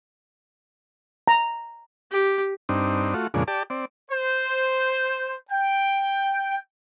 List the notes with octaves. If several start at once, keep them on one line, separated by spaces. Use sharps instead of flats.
A#5
G4
G2 C4 D4 D#4
A3 F4 F#4
F2 A#2 C#3 G#3 D4
G4 D5 A5
C4 D5
C5
G5